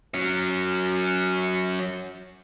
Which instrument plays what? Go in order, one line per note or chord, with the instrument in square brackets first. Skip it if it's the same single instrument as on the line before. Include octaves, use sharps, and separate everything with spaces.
[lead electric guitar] F#3 C#4